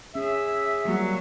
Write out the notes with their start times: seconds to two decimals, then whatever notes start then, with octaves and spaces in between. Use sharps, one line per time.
0.15 C#4 G#4 E5
0.85 F#3 G3 A#3 F#4